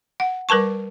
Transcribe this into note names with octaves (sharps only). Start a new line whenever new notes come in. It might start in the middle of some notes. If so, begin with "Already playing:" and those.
F#5
G3 A#4 B4 A5 C#6